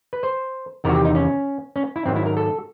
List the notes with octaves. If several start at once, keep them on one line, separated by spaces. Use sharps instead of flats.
B4
C5
E2 C3 D#3 F#4 A#4
G4
D#4
C#4
C#4
E4
G#2 D#3 F#3 C4
E4
A#4
A4